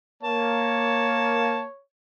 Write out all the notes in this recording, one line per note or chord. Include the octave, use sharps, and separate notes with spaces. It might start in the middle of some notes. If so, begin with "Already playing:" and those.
A#3 C#5 A5